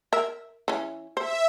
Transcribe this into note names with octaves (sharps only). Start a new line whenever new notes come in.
A#4 E5
E3 C#4
C5 E5